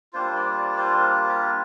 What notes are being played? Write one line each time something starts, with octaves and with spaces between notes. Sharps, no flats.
G3 A#3 D4 F4 C5
D5
D5
C5
A#4
G4